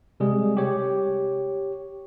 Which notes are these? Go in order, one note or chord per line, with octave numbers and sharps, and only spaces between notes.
C3 G3 G#3 G#4
G4 C#5